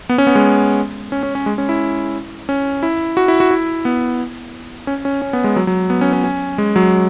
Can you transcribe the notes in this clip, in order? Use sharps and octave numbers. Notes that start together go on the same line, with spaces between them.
B3
C#4
B3
G#3
C#4
C#4
C#4
G#3
C#4
E4
C#4
E4
F#4
E4
F#4
E4
B3
C#4
C#4
C#4
B3
G#3
F#3
F#3
B3
C#4
C#4
C#4
G#3
F#3